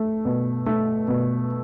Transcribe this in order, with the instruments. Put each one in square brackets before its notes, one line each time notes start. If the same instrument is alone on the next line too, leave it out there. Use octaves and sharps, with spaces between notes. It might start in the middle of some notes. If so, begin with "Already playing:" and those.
Already playing: [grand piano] A3
B2
A3
B2